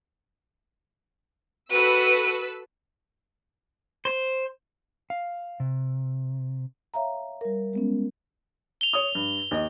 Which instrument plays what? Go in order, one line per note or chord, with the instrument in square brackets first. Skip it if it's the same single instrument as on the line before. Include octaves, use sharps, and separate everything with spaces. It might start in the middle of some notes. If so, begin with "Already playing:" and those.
[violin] F#4 D#7 [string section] A4 B4 E6
[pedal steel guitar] C5
[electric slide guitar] F5
C3
[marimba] C#5 E5 F5 A#5
G3 A#4
G#3 B3 C#4
[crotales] F7 G7
[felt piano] C#5 D#6
G2
D#2 D#5